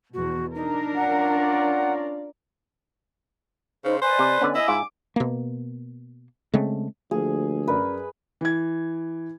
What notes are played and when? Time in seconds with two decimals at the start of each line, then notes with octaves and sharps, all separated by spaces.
0.13 E2 B2 F#4
0.55 D4 D#4 A#4
0.95 C#4 F4 D5 F#5
3.84 C#3 D#4 B4 C5
4.02 B4 C5 D5 D#5 G#5
4.19 C3
4.41 D3 B3 C#4
4.55 E4 D#5 G#5 E6
4.68 G#2 F4 D6
5.16 B2 A#3
6.54 C#3 G#3 A3 C4
7.11 D2 F3 A#3 G#4
7.68 F#2 A#4 B4 D5
8.41 E3 G#6